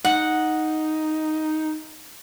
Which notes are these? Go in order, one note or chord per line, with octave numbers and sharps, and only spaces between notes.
D#4 F#5